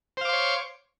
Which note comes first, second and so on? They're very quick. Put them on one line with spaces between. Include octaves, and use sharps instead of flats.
C5 F5 D6 C6 C#5